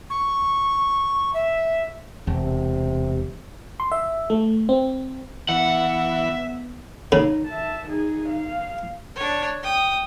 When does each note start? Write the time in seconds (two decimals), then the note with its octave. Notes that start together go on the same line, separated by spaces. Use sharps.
0.10 C#6
1.34 E5
2.27 E1 C3
3.80 C6
3.92 E5
4.30 A3
4.69 C4
5.49 E3 B3 E5 F#5
7.12 C#3 D#4
7.48 E5 A5
7.88 D#4 G#4
8.29 F5
9.16 D4 C#5
9.63 G5 D#6